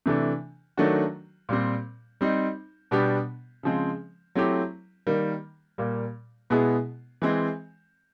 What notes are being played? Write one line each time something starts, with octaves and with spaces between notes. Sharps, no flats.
C3 E3 A3 D4
D#3 F#3 A3 D4 F#4
A#2 G3 C4
G3 C4 D#4
B2 G3 B3 D4 G4
C#3 F3 G#3 C4
F#3 A3 C4 E4 G4
D#3 G3 A#3
A#2 G3 A#3
B2 G#3 B3 E4 G#4
E3 G#3 C4